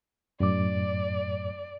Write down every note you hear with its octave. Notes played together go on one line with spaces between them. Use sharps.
F#2 A2 D5 D6